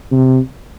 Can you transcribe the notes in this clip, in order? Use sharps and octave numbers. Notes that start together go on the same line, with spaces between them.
C3